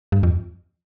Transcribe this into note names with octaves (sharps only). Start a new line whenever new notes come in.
G2
F2